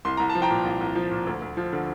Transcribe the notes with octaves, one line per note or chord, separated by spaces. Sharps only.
C2 C6
C2 A#5
A5
F3
G5 A#5
A#2
C2
C2
F3
A#2
D2
D2
F3
D3